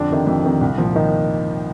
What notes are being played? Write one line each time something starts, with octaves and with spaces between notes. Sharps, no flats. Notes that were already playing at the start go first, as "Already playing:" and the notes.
Already playing: F2 D3 D4
C3 D#3
F2
C3 D#3
C2
A#2 F3
D#3 D#4